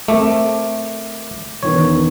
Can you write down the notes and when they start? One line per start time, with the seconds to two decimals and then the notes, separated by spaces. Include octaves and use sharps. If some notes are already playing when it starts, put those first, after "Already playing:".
0.08 A3 C4 A#4 D6
1.63 E1 D#3 B3 C#5